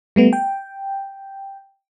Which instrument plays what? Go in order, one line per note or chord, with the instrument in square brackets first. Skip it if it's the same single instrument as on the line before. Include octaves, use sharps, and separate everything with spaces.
[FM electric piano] G3 A3 B3
G5